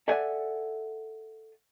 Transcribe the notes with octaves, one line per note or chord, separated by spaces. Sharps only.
A4 D5 E5 F#5 G#5